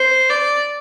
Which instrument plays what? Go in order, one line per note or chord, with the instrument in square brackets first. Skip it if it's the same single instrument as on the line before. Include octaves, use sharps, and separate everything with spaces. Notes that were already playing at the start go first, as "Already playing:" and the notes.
Already playing: [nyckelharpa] C5
D5